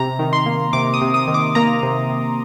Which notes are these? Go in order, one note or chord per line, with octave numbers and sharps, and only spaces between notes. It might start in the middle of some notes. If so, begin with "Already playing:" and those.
Already playing: C3 A#5
D#3
C6
A#3
C3 D6
D#6
C3
D#6
D#3
D6
A#3 A#5
C3
C3